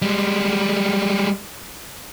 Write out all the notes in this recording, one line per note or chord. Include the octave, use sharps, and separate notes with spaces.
G3 G#3